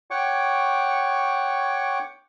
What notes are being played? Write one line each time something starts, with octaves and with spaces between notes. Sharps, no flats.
C#5 F#5 G5 C#6 D6